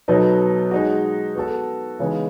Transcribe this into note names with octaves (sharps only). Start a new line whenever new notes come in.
B2 F#3 B3 D#4 A4
G#3 D#4 F#4
B3 F#4 A4
C#3 E3 G#3 B3 D#4